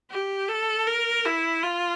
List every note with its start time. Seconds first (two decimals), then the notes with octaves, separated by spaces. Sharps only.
0.11 G4
0.49 A4
0.87 A#4
1.25 E4
1.63 F4